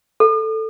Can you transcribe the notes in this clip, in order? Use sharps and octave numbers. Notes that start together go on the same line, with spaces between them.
A4